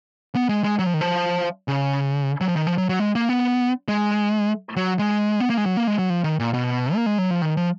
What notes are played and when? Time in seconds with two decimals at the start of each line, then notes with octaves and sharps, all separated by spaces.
0.35 B3
0.49 G#3
0.64 G#3
0.79 F#3
0.86 F3
0.94 D#3
1.01 F3
1.68 C#3
2.41 F#3
2.48 F3
2.56 D#3
2.67 F3
2.78 F#3
2.89 F#3
3.00 G#3
3.15 A#3
3.29 B3
3.88 G#3
4.76 F#3
4.99 G#3
5.40 B3
5.50 A#3
5.57 G#3
5.66 F#3
5.77 A#3
5.87 G#3
5.99 F#3
6.10 F3
6.24 D#3
6.40 A#2
6.54 B2
6.95 A#3
7.06 G#3
7.18 F#3
7.31 F3
7.42 D#3
7.57 F3